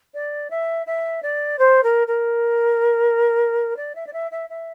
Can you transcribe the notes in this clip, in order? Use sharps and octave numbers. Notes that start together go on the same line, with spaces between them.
D5
E5
E5
D5
C5
A#4
A#4
D5
E5
D5
E5
E5
E5